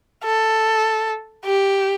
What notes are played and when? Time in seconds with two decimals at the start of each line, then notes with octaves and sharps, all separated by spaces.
0.24 A4
1.45 G4